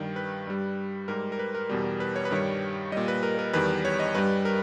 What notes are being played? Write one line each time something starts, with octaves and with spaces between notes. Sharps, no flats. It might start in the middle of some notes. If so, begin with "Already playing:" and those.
Already playing: G2 D#3 G3 G5
B4
G2 G3
G#2 G3 A#4
A#4
B4
A#4
E2 B2 G3
B4
C#5
B4
G2 D#3 G3 C#5
A#2 G3 D#5
B4
A#4
A#4
E2 D#3 G3 B4
C#5
D#5
G2 G3 B4
A#4